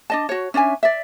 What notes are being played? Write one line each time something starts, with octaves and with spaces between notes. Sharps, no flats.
D4 D#5 A5
F#4 C#5
C#4 D4 E5 G#5
D5 E5